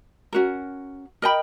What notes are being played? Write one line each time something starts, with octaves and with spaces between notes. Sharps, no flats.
C#4 F#4 A#4
A#4 D#5 G5 B5